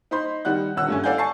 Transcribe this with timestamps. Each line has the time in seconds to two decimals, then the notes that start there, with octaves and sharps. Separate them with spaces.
0.11 D#4 C5 B5 C6 G6
0.45 D#3 G3 F#5 F#6
0.76 D#1 D3 F#5 E6 F#6
0.88 G2 A3 C#4
1.04 A4 D5 F5 F#5 G#5 G6
1.18 G#5 A5 C#6 C7